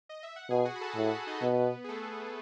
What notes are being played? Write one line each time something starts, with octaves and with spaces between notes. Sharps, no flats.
D#5
E5
F#5
B2 G#4 G#5
F#4 F#5
B5
A4 A5
A2 A4 A5
A4 A5
D#4 D#5
B2 B3 B4
G#4
A3 A4